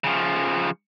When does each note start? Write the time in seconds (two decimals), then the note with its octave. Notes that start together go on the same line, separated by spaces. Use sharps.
0.04 C#3 F3